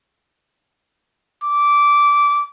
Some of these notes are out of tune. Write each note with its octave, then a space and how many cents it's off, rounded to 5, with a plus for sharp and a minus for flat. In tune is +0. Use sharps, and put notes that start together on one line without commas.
D6 -15